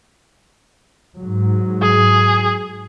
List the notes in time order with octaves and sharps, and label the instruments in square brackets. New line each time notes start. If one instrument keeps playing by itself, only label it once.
[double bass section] G#2 F#3
[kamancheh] G#4